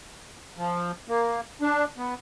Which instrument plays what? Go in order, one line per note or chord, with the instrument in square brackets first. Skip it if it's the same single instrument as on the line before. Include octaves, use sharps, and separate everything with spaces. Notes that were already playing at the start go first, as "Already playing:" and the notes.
[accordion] F3
A#3
D4
B3